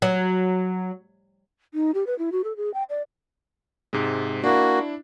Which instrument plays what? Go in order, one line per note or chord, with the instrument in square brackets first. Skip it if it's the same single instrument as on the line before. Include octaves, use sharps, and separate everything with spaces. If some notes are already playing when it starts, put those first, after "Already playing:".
[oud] F#3
[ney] D#4
G4
B4
E4
F#4
A4
G#4
G5
D5
[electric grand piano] G#2 C3 G#3
[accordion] A#3 F#4 [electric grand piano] D4 E4